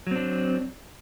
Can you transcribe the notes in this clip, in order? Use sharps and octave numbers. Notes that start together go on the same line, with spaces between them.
F#3 C4 D4